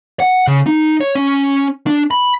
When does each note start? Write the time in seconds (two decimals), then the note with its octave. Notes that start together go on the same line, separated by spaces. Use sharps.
0.20 F#5
0.47 C#3
0.66 D#4
1.01 C#5
1.15 C#4
1.87 D4
2.11 B5